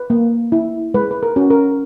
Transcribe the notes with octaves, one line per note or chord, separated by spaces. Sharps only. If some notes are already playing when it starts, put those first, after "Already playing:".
Already playing: B4
A#3
E4
G#3 B4
B4
A#4
C#4 F#4
A#4